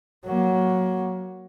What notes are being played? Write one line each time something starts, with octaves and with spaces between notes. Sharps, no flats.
F#3 A#3